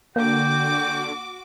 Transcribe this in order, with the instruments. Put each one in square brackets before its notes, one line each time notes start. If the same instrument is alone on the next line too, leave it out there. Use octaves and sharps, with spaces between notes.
[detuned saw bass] D3 [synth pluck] A#3 [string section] F#4 D6 [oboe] G5